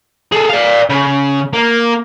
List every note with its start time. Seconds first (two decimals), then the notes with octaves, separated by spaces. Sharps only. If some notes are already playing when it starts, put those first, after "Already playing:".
0.32 G#4 A4
0.50 D5 F5
0.90 C#3
1.53 A#3